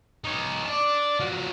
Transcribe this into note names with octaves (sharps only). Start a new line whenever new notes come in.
D#4 C#5
D5 A5
F3 F#4